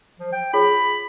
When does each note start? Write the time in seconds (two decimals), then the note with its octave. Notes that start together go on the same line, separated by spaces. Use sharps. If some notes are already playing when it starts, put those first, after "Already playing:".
0.19 F3
0.32 G5
0.53 F4 G#4 C#5 B5